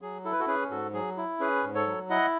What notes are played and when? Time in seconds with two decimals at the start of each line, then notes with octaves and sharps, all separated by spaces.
0.01 F#3 G#4
0.25 E4 A4
0.33 B4
0.40 F#4 A4
0.47 C#4 G#4 B4
0.70 G#2 F#4 A4
0.93 F#3 G#4
1.17 E4
1.40 C#4 G#4 B4
1.64 G#2
1.75 A4 C#5
1.87 F#3
2.10 E4 D#5 F#5